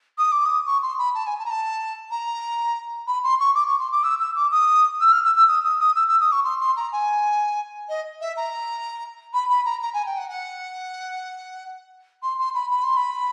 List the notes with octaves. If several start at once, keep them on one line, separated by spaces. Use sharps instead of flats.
D#6
D6
D#6
C#6
C6
B5
A5
G#5
A5
A#5
A5
A#5
B5
C6
C#6
D6
C#6
C6
D6
E6
E6
D6
D#6
E6
F6
E6
E6
D#6
D#6
D#6
E6
E6
D#6
C#6
C6
C6
A#5
G#5
D#5
E5
A#5
B5
B5
A#5
A#5
G#5
G5
F#5
F#5
C6
C6
B5
B5
C6
B5